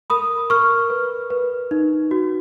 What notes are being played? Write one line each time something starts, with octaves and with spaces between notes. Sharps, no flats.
A#4 B5 D#6
A#4 C#6 F6
B4
B4
D#4
F#4